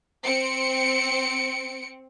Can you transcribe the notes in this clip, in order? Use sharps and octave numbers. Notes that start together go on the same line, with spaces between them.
C4 C#7 D7